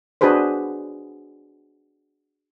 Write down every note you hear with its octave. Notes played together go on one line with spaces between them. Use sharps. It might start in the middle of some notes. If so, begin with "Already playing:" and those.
D4 F#4 G#4 B4 C5